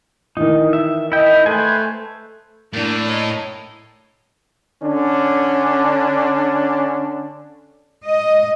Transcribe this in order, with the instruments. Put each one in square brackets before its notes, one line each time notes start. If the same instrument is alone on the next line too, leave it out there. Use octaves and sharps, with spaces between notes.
[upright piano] D#3 E3 [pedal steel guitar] D#4
[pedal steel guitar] E5
[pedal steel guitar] E4 G5 [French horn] D#5
[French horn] A3 [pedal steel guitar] B4 C5 G#5
[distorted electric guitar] A2 [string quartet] A#3 D4
[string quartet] C#5 D#5 A#5
[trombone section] D3 C#4 D4
[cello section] D#5